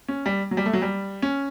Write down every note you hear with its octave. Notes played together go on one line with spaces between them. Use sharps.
C#4
G3
F#3
G3
A3
F#3
G3
C#4